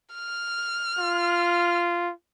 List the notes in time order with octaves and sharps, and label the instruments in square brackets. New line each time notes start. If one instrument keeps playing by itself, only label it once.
[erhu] F6
[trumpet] F4